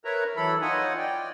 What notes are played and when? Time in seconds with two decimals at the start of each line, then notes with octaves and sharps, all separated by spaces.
0.05 A#4 B4 C#5 E5 A#5
0.36 E3 F#3 E4 A4 B5
0.62 D#4 F4 C#5 D#5 F#5 G#5
0.97 D5 G5